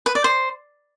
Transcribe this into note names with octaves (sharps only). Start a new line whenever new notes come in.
B4
D5
C5